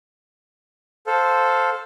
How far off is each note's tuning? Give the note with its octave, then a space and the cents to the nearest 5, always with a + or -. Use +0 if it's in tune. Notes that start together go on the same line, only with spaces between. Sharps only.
A4 +0 C5 +0 F5 +15